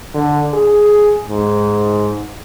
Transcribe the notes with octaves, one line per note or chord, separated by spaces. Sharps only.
D3
G#4
G#2